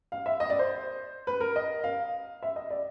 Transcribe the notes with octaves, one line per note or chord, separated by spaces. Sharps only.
F5
E5
D#5
D5
C5
B4
A#4
D#5
F5
E5
D#5
D5